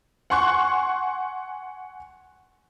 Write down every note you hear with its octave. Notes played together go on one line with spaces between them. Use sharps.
F#5 G#5 C6 C#6 F#6